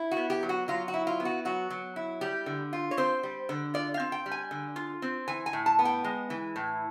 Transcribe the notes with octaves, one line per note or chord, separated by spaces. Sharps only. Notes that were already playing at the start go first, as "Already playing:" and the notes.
Already playing: E4
F#4
B3
G4
F#3
F#4
F#3 F4
F#4
E4
F4
B3
F#4
F#3 F#4
F#3
E4
G3 G4
D3
F4
C#5
C4 C5
G3
D3
F4 D5
F5
C4
G5
G3
G#5
D3
F4
C4
E3 G#5
G#5
A2
A5
B3
G5
G#3
E3
A2